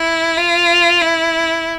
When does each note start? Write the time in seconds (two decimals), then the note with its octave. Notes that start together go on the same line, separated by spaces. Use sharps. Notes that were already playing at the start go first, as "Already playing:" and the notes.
Already playing: E4
0.37 F4
1.01 E4